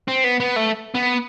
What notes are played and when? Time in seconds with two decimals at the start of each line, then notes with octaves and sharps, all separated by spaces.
0.08 C4
0.24 B3
0.40 B3
0.56 A3
0.94 B3